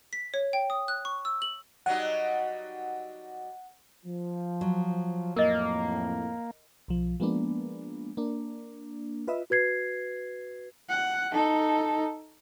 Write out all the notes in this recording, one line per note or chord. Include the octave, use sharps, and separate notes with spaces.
B6
C#5
G5
D#6
F#6
C#6
E6
F#7
F#3 G3 D#4 F#5
F3
F#3
F2 A2 A#3 A#4 D#5
B1 F3
F3 G#3 A#3 B3 D4
A#3 D4
F4 B4 D#5 E5
F#4 B4 G#6 C7
F#5
D#4 A4